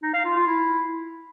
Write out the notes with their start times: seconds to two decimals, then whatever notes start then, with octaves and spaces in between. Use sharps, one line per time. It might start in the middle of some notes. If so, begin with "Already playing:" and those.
0.03 D#4
0.14 F5
0.25 F4
0.36 F4
0.47 E4